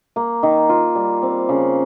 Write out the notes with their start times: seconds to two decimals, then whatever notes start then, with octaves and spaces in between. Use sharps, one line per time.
0.16 A#3
0.43 D#3
0.69 F4
0.95 G3
1.23 C4
1.49 C#3